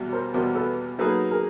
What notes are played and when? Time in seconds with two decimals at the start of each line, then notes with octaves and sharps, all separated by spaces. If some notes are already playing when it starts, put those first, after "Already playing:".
Already playing: E2 B2 G3
0.13 A#4 C5
0.34 E2 B2 G3 A#4 C5
0.55 A4 B4
0.99 F#3 A#3 D#4 G#4 A4 B4
1.31 G#4 A#4